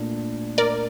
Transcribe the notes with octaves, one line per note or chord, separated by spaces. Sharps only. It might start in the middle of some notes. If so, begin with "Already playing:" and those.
Already playing: A#2 A3 D4
A#4 D5